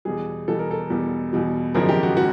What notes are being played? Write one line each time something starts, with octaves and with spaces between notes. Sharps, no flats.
E2 B2 G3 G#4
E2 B2 G3 A4
A#4
A4
E2 B2 G3
E2 B2 G3
G#1 F#2 C#3 F3 G#3 A#4
G4
F#4
F3 G#3 F#4